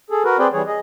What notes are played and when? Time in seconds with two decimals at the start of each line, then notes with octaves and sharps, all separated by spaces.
0.10 G#4 A4
0.25 F#4 A#4 B4
0.39 C4 G#4 B4 C5 D5 G5
0.53 E3 G3 G#4 C#5
0.67 G#4 D#5